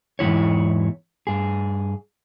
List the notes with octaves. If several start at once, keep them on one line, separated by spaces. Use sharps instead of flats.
E2 G#2 C#3 E4 C#5
G2 G#4